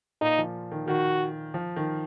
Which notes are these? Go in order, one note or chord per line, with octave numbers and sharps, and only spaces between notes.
A#2 D#4
F3
D#3
D#3 F#4
F3
D#3